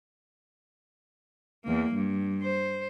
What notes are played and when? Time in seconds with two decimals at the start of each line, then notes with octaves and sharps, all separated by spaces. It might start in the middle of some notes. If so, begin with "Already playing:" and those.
1.65 E2 A#3
1.94 G2
2.43 C5